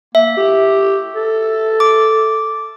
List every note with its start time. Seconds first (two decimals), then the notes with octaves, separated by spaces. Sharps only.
0.15 A#3 E5
0.37 G4
1.16 A4
1.80 D6